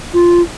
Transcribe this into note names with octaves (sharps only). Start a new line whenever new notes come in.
F4